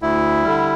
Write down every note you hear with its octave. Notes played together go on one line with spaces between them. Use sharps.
D2 E4
D3 G3